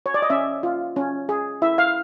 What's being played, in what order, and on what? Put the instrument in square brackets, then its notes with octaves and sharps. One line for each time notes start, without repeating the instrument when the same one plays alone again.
[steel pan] C#5
D5
D#5
C#4 E5
F4
C#4
G#4
E4 E5
F5